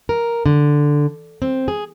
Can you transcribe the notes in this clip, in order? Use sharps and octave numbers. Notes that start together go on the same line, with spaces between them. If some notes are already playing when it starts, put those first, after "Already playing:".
A#4
D3
C4
G#4